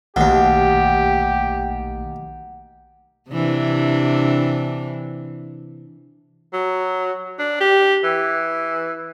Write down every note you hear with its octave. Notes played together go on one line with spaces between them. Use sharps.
A#1 D#2 B2 D#3 A3 G4 F#5
C3 E3 D4
F#3
D4
G4
E3